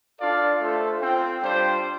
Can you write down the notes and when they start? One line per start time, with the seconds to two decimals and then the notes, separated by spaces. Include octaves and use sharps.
0.20 D4 F4 A4 D5 F5
0.60 A3 F4 A4 C5
1.00 C4 F4 C5 G5
1.41 G3 D4 F4 C5 G5